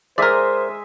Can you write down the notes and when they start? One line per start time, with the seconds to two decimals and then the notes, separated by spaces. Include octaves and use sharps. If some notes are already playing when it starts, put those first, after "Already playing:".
0.18 G#3 A#4 C5 D5 E5 D#6